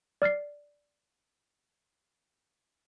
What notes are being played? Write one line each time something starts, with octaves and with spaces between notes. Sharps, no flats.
D5 F6 A6 C7